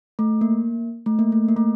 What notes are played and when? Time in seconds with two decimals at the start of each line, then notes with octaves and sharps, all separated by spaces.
0.19 A3
0.41 A#3
1.06 A3
1.19 A#3
1.32 A3
1.49 A#3
1.57 A3